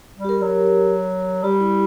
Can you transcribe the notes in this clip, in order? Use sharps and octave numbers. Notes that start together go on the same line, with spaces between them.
G3
G4
A#4
F#3
G3 G4
E4